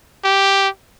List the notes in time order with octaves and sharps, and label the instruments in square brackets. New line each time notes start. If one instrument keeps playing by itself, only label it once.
[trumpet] G4